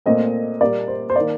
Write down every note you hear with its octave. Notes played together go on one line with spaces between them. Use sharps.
A#2 A3 C4 D#5
A#2 G3 A#3 D5
C5
C5
D#3 A#3 D5